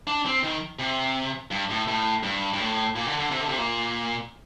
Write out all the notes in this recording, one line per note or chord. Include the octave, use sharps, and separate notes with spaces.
D4
C4
D#3
C3
G2
A2
A2
G2
G2
A2
A#2
D3
D3
C3
D3
C3
A#2